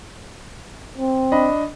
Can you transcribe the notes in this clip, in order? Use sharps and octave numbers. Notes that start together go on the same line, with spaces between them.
C4
D4 D#5 B5